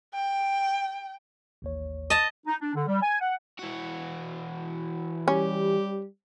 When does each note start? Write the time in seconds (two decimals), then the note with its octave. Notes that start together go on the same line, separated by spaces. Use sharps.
0.14 G5
1.62 A1 D#2 C#5
2.10 D#5 A5
2.46 D#4
2.61 D4
2.74 D3
2.87 G3
3.02 G#5
3.20 F#5
3.59 E3 F#4
5.28 G3 C#4 G4